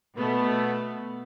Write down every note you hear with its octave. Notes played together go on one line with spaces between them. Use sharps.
B2 A3 B3